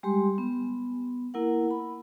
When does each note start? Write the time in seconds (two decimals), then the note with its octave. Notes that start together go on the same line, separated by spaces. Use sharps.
0.03 G3 G#3 G4 C6
0.38 B3
1.34 A#3 E4 A#4 F#5
1.71 B5